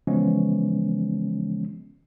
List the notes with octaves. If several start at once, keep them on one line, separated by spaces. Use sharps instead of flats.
C#3 E3 F3 G#3 B3 C#4